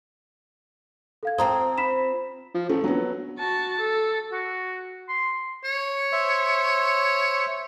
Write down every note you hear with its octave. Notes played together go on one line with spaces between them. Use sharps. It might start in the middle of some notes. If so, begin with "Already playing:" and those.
A4 F5 G#6
C4 F4 C5 A5 A#5 D#6
B5 B6 E7
F3
A1 A3
A#1 F#3 B3
F#4 A5
A4
F#4
C6
C#5
C5 E5